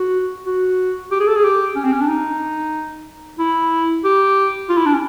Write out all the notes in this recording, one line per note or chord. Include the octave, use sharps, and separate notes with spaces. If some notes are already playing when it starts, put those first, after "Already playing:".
Already playing: F#4
F#4
G4
G#4
A4
G#4
G4
C#4
C4
C#4
D4
D#4
E4
G4
F4
E4
D4
C#4